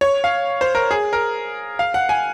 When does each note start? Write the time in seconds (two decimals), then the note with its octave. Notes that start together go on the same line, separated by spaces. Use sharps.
0.01 C#5
0.24 F5
0.61 C5
0.75 A#4
0.91 G#4
1.13 A#4
1.79 F5
1.94 F#5
2.09 G#5